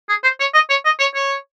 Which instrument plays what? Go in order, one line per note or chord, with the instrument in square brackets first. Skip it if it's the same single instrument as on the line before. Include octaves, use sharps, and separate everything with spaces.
[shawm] G#4
C5
C#5
D#5
C#5
D#5
C#5
C#5